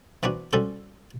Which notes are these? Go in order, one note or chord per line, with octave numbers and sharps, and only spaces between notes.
E3 B3 C4 D4 F#4
G3 C#4 F#4 A4 C5